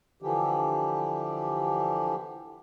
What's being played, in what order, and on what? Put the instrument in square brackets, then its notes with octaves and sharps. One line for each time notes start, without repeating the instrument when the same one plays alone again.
[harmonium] D3 E3 F3 G4